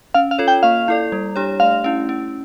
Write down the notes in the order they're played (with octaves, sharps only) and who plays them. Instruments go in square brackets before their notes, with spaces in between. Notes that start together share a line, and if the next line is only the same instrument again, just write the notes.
[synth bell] C#4 [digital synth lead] F5
[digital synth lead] F5
[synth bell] F4 A4 C#5
[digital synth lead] G5
[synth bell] A#3 [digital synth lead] F5
[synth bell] E4 A4 D5
G3
D4 G4 C#5
[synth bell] A3 [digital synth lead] F5
[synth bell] C#4 E4
C#4